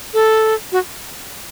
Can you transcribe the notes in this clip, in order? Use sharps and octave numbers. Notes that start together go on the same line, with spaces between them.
A4
F#4